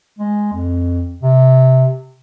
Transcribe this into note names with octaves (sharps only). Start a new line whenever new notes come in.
G#3
F2
C3